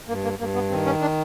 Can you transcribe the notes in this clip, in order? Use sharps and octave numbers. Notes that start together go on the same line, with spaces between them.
G2 A#3
A#3
G2 A#3
B3
D#3 C4
C#4
D4